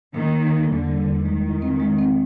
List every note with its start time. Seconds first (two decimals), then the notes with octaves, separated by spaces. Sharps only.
0.14 D#3 A#3
0.33 A#3
0.52 A#3
0.69 E2 D3
0.88 G3
1.07 E2
1.25 D#3 G#3
1.44 E4
1.62 C4
1.80 G#3
1.99 C4